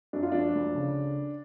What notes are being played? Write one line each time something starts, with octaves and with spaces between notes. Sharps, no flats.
F#2 D4
F4
F3 D4
D2
C#3